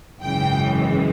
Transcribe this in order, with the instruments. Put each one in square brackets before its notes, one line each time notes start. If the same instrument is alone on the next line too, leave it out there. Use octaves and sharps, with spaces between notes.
[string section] G#1 F#2 C#3 E3 G#3 G5